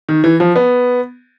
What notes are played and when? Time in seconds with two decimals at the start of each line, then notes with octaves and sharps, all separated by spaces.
0.09 D#3
0.24 E3
0.40 F3
0.56 B3